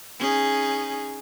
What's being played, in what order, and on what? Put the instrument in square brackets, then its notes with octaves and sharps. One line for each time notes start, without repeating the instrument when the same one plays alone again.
[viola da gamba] C#4 D#4 G#4